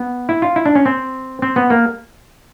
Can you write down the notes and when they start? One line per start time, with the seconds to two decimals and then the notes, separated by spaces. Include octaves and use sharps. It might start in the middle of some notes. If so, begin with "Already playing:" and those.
Already playing: B3
0.29 E4
0.42 F4
0.56 E4
0.66 D4
0.75 C#4
0.85 C4
1.42 C4
1.56 B3
1.70 A#3